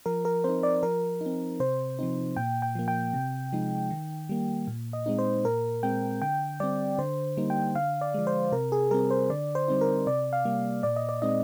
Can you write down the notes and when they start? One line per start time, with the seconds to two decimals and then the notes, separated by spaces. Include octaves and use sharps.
0.06 F3 A#4
0.25 A#4
0.44 C4 D#4 C5
0.63 D5
0.83 F3 A#4
1.21 D#4
1.26 C4
1.60 C3 C5
1.99 F3 C4 D#4
2.37 A#2 G5
2.62 G5
2.75 F3 A#3
2.88 G5
3.14 C3
3.53 F3 G#3 D#4
3.90 D#3
4.29 G3 A#3
4.67 A#2
4.93 D#5
5.06 G#3 C4 D#4
5.19 C5
5.45 A#2 A#4
5.83 G#3 C4 G5
6.21 D3 G5
6.60 G3 C4 D5
6.98 D3 C5
7.37 G3 A#3 D#4
7.50 G5
7.75 D3 F5
8.01 D5
8.14 F3 G#3
8.27 C5
8.52 C3 A#4
8.72 G#4
8.91 G3 C4 A#4
9.11 C5
9.29 D3 D5
9.55 C5
9.68 G3 C4 D#4
9.81 A#4
10.06 C3 D5
10.33 F5
10.45 G3 A#3
10.83 A#2 D5
10.96 D#5
11.09 D5
11.22 G#3 C4 D#4 D#5